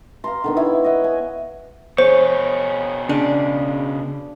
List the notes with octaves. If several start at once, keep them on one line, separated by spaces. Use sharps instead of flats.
F5 A#5 C6
D3 D#3 B3
D#4 E4 C#5 E5
D#5 E5 F#5
G#5
B2 G#4 C5 C#5
C#3 D4